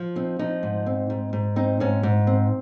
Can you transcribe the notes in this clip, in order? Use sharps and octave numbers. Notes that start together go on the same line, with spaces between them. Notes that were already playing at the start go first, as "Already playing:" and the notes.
Already playing: F3
C4 D#4
F3 D#4
G#2
C4
G#2
G#2
C4 D#4
G#2 C#4
G#2
C4